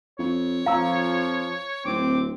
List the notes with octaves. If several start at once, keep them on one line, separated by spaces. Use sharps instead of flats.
F2 C#5
F2 F3 F5 A#5 E6
D1 C4 D6